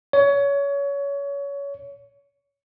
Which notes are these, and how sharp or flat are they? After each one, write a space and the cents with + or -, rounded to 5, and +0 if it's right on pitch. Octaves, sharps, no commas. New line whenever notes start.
C#5 +25